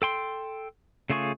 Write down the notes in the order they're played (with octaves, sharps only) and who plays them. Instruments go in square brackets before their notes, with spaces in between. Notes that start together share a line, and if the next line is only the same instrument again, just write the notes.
[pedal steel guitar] A4 G5 C6
C#3 A3 F4 G#4 C#6